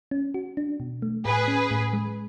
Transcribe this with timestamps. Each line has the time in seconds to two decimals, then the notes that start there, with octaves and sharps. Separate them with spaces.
0.11 C#4
0.34 F#4
0.57 D4
0.80 B2
1.02 A3
1.25 A2 G#4 B4
1.48 C#4
1.71 A2
1.93 G#3